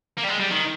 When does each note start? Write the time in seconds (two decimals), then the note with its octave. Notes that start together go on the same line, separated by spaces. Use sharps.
0.18 A#3
0.24 G3
0.29 G#3
0.40 G3
0.51 D#3